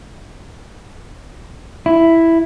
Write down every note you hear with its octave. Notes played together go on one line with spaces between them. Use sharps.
E4